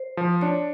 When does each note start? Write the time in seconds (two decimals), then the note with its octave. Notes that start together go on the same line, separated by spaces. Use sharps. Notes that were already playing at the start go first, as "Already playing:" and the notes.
Already playing: C5
0.17 F3
0.41 D4 C#5